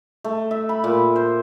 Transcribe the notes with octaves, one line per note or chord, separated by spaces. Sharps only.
A3
E5
B5
A#2
C5